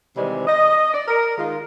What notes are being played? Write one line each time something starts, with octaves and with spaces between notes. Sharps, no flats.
C3 D#3 E3 G3 G#3 C4
D#5
D5
A#4
D#3 G#3 D#4 F4